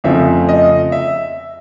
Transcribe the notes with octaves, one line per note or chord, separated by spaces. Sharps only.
F2 C#3 F3 A3 E5
D#5
E5